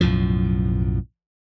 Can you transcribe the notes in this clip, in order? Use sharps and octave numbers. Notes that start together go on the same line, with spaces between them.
B1 F#2 A2 F3